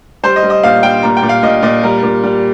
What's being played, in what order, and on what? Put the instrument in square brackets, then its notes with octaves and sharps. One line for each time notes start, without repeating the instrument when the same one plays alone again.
[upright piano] G3 C5
D#5
G3
D#5
A#2 F5
G3 G5
A#2 A#5
G5
A#2
F5
A#2 D#5
A#2 D#5
G3 A#4
A#2
G3